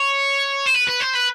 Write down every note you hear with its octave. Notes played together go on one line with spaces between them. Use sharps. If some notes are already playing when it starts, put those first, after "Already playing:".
Already playing: C#5
C5
B4
B4
C5
B4